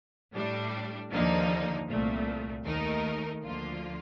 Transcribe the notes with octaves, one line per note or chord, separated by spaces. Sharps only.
A2 G3 D4
D#2 D3 F3 A#3 D#4
C2 A#2 A3
D#2 D#3 A3 D#4 A#4
D2 D3 F3 A#3 F4